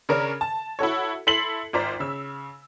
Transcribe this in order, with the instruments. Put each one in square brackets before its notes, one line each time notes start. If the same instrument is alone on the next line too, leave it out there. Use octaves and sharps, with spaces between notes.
[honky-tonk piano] C#3 C#4 D4 A#4
A5
E4 F#4 A4 C#5
E4 A4 C6 B6 C7 F#7
G#1 F4 C5 D5 A#5 B6
C#3 E6